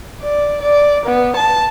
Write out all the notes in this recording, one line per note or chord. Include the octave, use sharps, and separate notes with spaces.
D5
D5
B3
A5